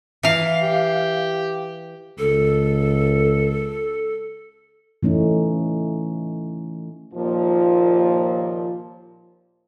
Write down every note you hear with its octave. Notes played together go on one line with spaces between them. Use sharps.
E3 F5
G4
C#2 A4
E3 A3 C#4 D#4
D#2 A#2 F3